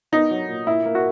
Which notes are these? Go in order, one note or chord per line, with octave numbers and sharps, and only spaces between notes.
B3 D#4
F#3
A#2
A#2 E4
A#3
F#4